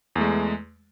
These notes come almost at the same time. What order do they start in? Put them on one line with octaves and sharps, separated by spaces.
E2 A3 G#3